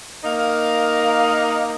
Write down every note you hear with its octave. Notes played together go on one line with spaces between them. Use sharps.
A#3 D#4 A#4 F5